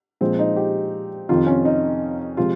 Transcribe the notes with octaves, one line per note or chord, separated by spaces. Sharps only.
A#2 F3 G#3 C4
D#4
G4
F2 C3 D#3 F4
C#4
D#4
C3 F3 G#3 F4